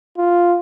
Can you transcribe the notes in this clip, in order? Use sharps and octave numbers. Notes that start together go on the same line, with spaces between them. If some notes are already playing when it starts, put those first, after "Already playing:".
F4